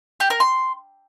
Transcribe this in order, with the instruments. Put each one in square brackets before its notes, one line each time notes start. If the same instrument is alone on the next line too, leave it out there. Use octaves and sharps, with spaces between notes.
[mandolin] G4
A#4
C6